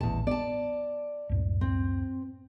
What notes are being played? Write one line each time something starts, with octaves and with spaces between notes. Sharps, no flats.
D#1 A1 E2 A5
B3 D5 A5
C#2 F#2 A2
C4